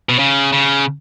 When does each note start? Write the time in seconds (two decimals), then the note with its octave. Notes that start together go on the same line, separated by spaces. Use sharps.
0.09 B2
0.19 C#3
0.53 C#3